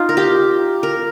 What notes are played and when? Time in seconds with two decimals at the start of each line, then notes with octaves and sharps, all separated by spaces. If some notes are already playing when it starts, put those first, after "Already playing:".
Already playing: D#4 F4
0.09 A#4
0.17 G4
0.83 A#4